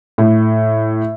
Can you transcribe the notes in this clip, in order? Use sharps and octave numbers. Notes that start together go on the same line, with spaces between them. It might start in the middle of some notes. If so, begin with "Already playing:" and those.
A2